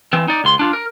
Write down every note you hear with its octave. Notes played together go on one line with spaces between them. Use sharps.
E3 C4
D#4 D5
C#2 C6
D4 F4
A#4